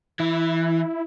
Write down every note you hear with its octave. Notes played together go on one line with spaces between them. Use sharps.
E3 E4